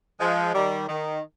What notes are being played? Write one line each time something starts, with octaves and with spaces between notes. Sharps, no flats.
F3 G#3
D#3 G3
D#3